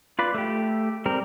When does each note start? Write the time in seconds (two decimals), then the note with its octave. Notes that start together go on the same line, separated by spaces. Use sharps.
0.19 F4 B4 D5
0.34 A3 G4
1.06 G3 C4 A#4